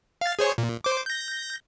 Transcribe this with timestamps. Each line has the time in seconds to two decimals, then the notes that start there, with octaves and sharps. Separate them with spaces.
0.21 F5 A6
0.39 G#4 C5 C#5
0.58 A#2
0.84 C5 D6
1.06 G6 A#6